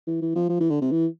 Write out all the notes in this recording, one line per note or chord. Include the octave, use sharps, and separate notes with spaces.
E3
E3
F3
F3
E3
D3
C3
E3